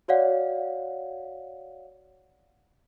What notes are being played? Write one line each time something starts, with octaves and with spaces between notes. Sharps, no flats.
F#4 C#5 D5 F5 F#5